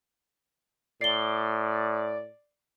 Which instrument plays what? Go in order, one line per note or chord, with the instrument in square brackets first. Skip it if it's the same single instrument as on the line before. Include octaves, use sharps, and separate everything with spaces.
[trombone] A2 [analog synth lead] D5 [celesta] C7 G7